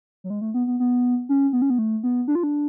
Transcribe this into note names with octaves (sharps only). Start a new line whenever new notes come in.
F#3
G#3
A3
B3
B3
B3
C#4
B3
C#4
B3
A3
B3
D4
F4
D4